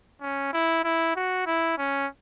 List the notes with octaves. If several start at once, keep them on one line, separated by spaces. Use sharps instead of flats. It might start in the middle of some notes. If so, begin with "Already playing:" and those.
C#4
E4
E4
F#4
E4
C#4